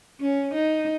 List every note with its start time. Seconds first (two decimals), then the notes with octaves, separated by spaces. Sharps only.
0.21 C#4
0.54 D#4